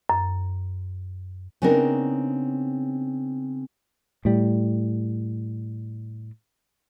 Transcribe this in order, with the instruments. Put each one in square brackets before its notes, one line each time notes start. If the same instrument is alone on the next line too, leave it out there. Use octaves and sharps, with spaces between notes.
[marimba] F#2
[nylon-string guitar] C#3 B3 C4 D4 D#4 A#4
[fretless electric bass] A2 G3